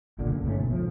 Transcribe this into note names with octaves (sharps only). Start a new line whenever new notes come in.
F#1 B1 A#2 D3
F#1 C#2
G1 G#2 A3 C#4
B2
F3